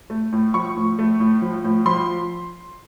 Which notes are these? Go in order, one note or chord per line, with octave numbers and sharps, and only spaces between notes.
A3
A2
F3 C#6
A2
A3
A2
F3
A2
F3 C6